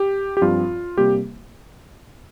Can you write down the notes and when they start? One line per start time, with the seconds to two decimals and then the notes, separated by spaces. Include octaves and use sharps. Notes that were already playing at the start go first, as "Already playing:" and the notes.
Already playing: G4
0.37 G4
0.41 G2 F3 C4 F4
0.98 C3 G3 A#3 G4